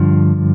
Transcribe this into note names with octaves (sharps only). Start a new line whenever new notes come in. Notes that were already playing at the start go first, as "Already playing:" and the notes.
Already playing: G2 D3 F3